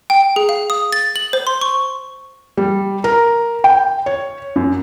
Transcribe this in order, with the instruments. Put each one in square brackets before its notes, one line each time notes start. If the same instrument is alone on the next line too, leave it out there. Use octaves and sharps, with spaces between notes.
[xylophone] G5
G#4
F5
D#6
A6
F#7
C5
C6
C#6
[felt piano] G3
A#4
G5
C#5
F#2